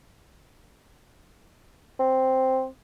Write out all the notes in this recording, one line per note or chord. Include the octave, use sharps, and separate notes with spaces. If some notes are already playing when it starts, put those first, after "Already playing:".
C4